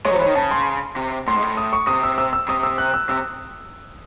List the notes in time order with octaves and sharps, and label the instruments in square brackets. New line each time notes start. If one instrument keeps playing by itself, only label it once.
[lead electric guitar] G#3 [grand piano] C#5
[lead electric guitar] E3 F#3 [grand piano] C5
[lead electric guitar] D#3 [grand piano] C#5
[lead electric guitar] C#3 [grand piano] A5
[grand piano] C6
[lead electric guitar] C3
[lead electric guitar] A2 [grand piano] C6
[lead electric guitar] G#2
A2
[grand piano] D#6
C#6
[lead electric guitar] C3 [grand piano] D#6
[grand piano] E6
E6
E6
[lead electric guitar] C3 [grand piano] D#6
[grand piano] E6
F#6
E6
[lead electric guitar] C3 [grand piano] E6